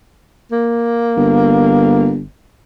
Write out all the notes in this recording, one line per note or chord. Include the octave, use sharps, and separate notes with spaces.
A#3
G1